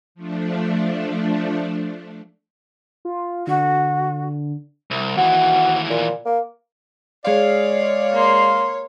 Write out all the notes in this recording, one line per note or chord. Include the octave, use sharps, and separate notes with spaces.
F3 A3 D4
F4
D3 F#4
C2
D#2 E3 F#4
A#2
A#3
G#3 C#5 D5 F5
A#3 C6